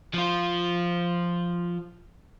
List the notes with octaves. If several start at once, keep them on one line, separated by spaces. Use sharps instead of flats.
F3 F4